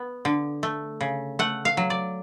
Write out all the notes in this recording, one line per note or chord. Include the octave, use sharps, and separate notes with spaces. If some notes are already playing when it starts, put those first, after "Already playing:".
Already playing: B3
D3
A3
C#3
A3 F#5
F5
F#3
D5